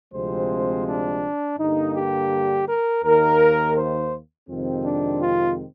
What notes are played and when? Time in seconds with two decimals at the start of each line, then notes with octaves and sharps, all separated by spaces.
0.13 D2 C3 F3 G#3 C4 C5
0.86 D4
1.58 G2 D3 G3 A#3 D#4
1.94 G4
2.67 A#4
3.03 D#2 D#3 A#3 A#4
3.75 C5
4.48 F2 C3 D#3 G#3 C4
4.85 D4
5.20 F4